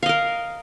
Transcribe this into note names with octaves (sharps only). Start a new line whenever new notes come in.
A#4 D#5 F5